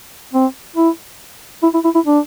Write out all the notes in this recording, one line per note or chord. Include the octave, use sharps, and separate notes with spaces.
C4
E4
E4
E4
E4
E4
D4